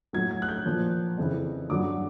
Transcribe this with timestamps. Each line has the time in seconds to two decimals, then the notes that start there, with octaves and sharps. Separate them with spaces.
0.13 A2 F#3 G#6
0.31 G#6
0.42 F#6
0.49 G6
0.66 A#2 F3
1.17 F2 C#3 E3
1.69 G2 D3 F#3 D6